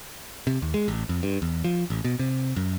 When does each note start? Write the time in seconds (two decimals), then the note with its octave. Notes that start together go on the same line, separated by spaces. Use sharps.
0.47 C3
0.62 D#2
0.74 G#3
0.88 A1
1.09 F2
1.23 G2
1.42 E2
1.64 F3
1.90 A1
2.04 B2
2.19 C3
2.57 F#2